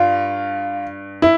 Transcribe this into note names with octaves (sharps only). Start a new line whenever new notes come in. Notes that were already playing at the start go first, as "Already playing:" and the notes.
Already playing: G2 F4
E4